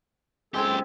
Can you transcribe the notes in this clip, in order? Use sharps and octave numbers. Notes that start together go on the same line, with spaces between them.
C#2 G#3 C4 G4 A4 G#5